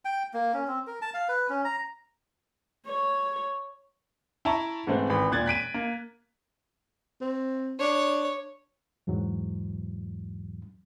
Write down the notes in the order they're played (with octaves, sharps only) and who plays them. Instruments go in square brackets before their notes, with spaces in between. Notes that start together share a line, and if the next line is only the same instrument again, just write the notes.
[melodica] G5
A#3
C#4
C4
A#4
A5
F5
B4
C#4
A#5
[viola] C#5
[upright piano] E4 E5 A5 A#5 C#6
G#2 E3 A3 C4
G#1 E3 B5
E1 A#2 F#6 G#6 A6
F#6 B6 D7 D#7
A#3
[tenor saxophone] C4
[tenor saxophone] D4 [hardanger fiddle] C#5
[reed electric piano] E2 G#2 E3 F#3